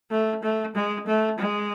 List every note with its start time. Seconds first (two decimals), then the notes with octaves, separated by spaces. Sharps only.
0.11 A3
0.43 A3
0.75 G#3
1.07 A3
1.39 G#3